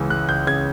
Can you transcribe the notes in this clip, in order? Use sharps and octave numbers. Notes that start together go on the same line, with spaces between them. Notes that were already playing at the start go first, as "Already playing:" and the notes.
Already playing: C#2 C#3 E3 G#3
G#3 F#6
C#2 G6
C#3 G#6